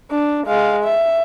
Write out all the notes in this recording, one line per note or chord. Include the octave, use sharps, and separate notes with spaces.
D4
G#3 F5
E5